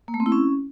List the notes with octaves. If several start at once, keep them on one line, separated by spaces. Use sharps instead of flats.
A#3
A3
C4
E4
C#4